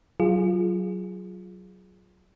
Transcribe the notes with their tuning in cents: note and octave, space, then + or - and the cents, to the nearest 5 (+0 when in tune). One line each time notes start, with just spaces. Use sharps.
F#3 +15 F4 +0 G#4 +0